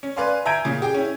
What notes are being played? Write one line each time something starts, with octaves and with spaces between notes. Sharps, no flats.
C#4
B4 D5 F5 G#5 C6
E5 G#5 A#5 G6 G#6 D7
A#2 C#3
G4 G#4 G5
C#4 E4